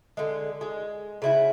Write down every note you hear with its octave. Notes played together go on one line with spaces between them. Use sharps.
D3 G#3
G#3
C#3 E4 F#4